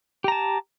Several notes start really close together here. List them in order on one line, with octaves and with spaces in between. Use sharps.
G4 A#5 A5